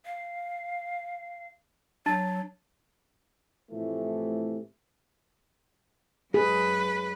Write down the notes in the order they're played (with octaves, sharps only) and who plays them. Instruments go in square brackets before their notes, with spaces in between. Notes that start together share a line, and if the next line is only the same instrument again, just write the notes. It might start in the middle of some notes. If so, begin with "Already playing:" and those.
[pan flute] F5
[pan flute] F#3 [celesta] D4 A5 A6
[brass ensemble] A2 C3 E3 F3 A3
[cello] F#2 B4 [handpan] G#4